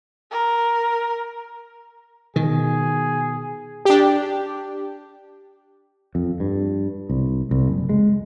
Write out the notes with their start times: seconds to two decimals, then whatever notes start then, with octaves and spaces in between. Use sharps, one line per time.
0.31 A#4
2.36 B2 D#3 G#4
3.85 D4 G4
6.15 F2
6.40 G2
7.09 C2
7.51 C2
7.68 F#1
7.89 G#3